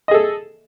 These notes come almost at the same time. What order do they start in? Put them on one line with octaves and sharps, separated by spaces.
D#5 G#4 A4